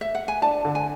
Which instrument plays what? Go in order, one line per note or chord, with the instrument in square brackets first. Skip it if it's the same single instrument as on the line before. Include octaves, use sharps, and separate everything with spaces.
[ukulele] E5
F#5
G#5
[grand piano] D4 [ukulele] A5
[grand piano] D3
[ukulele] G#5